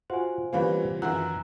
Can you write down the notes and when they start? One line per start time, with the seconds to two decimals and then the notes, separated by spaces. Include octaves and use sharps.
0.10 F4 F#4 C5 G#5
0.53 E3 G3 A#3 C4 C#4 B4 C5 F5
1.02 F#2 D#3 E3 E5 F#5 A#5 E6 F#6